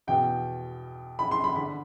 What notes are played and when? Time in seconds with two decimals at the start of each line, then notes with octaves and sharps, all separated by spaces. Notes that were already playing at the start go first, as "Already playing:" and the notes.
0.07 E2 B2 G5
1.19 B5
1.31 C6
1.44 B5
1.56 D3 B5